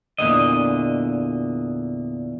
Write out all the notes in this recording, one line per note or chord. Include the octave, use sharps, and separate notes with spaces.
E2 A#2 D3 D#5